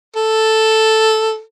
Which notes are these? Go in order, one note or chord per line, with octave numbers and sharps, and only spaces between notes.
A4